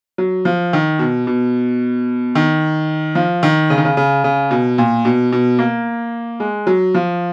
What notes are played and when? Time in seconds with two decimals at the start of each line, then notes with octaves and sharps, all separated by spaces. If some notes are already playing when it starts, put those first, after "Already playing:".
0.18 F#3
0.45 F3
0.73 D#3
0.99 B2
1.27 B2
2.35 D#3
3.15 F3
3.43 D#3
3.70 C#3
3.78 D#3
3.85 C#3
3.97 C#3
4.24 C#3
4.51 B2
4.78 A#2
5.05 B2
5.32 B2
5.59 A#3
6.40 G#3
6.67 F#3
6.95 F3